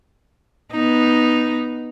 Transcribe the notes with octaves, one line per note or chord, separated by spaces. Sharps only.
B3 D#4